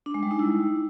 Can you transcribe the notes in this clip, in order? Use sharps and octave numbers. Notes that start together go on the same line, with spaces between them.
D4
G#3
G3
D#4
E4